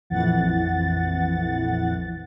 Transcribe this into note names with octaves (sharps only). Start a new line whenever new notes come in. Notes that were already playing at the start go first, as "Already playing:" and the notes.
A#1 F2 E3 F#5 A6